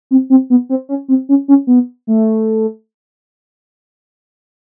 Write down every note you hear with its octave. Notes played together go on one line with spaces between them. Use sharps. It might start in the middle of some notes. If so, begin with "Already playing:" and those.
C4
C4
B3
C4
C#4
C4
C#4
C#4
B3
A3